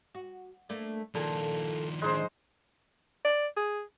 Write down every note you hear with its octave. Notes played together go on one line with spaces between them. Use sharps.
F#4
A3 A#3 D4
A#2 D#3 F3 G#4 A4
A2 G#3 D4 D#4 C5
D5
G#4